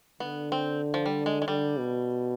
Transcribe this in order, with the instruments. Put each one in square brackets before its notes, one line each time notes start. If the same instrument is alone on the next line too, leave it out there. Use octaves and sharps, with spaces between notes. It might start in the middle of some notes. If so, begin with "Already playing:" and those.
[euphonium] D3 [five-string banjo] B3
[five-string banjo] C4
F3
G3
G#3
G#3
[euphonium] D3 [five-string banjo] G3
[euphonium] B2